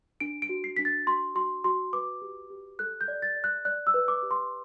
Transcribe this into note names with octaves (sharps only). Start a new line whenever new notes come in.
D4 D7
D7
F#4
C7
D4 B6
A6
F#4 C6
F#4 C6
F#4 C6
B4 D6
G4
G4
A4 F#6
G6
D5
A6
D5
F#6
D5 F#6
E6
B4
D6
G4
C6